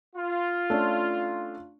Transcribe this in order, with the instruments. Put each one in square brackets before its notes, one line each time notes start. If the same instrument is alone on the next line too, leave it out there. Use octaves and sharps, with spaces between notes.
[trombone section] F4
[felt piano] A3 C#4 D4